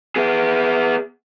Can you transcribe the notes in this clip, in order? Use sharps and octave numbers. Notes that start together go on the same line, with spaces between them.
B3 G#4